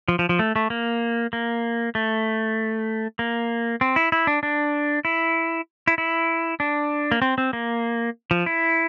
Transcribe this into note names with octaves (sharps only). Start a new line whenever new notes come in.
F3
F3
F3
A3
A3
A#3
A#3
A3
A#3
C4
E4
E4
D4
D4
E4
E4
E4
D4
A#3
C4
C4
A#3
F3
E4